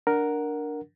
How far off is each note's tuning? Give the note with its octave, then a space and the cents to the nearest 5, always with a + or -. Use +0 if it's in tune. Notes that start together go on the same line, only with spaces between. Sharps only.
D4 +0 A#4 +0 F#5 +0